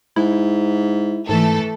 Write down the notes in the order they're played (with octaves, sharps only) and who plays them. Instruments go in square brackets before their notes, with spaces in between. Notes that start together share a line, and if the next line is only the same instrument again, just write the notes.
[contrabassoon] G#2 [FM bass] E4
[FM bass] G#2 [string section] E3 A3 A4